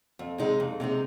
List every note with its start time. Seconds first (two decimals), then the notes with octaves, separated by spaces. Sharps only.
0.19 F2
0.38 C3 G#3 D#4
0.60 F2
0.80 C3 G#3 D#4